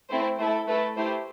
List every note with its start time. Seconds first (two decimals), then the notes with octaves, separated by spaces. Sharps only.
0.10 A3 C4 E4 C5
0.39 A3 E4 A4 C5
0.67 A3 E4 A4 B4
0.96 A3 E4 G4 C5